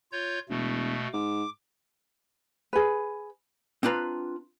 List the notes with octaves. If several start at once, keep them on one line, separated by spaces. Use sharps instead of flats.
F4 C#5 G6
E1 B2 A3
G#2 D6
G#4 B4
C4 D4 F4 B4 A#5